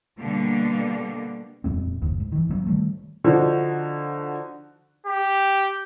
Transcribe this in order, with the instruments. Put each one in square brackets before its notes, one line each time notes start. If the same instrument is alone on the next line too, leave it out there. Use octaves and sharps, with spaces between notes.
[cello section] B2 D3 G3 A#3
[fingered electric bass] D#1 F2 G#2 C4
F#1 D#2
G#2
D#3 E3
G#2 F#3 B3
D#3 G3 A3
[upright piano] D3 F3 D#4 F#4
[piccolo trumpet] G4